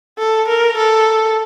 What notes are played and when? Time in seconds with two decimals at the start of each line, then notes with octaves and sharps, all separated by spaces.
0.19 A4
0.48 A#4
0.77 A4